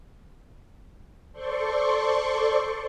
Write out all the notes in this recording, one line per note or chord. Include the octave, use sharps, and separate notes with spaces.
A4 C5 D5 C6 C#6